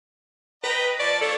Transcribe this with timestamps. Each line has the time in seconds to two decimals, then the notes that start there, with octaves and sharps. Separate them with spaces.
0.64 B4 D#5 G5 A#5
0.99 F3 D5 A5 C#6
1.21 A#3 D4 A4 C#5